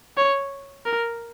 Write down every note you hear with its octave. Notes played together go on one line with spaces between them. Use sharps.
C#5
A#4